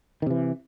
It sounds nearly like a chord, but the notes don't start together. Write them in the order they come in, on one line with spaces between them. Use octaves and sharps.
D#3 C3 E3